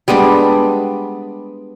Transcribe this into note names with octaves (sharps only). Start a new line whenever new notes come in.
G3 G#3 B3 D4